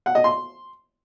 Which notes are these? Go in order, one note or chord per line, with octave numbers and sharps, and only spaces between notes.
F#5
D#5
C6